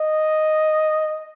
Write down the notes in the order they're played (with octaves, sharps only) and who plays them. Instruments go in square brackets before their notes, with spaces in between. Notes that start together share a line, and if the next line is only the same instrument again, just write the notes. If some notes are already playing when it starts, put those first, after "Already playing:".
Already playing: [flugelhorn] D#5